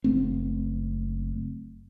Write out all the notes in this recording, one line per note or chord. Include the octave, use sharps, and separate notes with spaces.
F#1 A3 C4